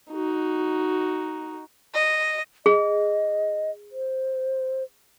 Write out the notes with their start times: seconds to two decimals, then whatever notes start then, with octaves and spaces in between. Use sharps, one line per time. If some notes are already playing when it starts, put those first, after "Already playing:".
0.11 D#4 F#4
1.94 D#5
2.66 G#4 D#5
3.92 C5